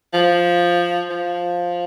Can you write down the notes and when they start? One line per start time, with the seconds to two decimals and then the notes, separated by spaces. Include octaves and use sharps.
0.13 F3
1.09 F3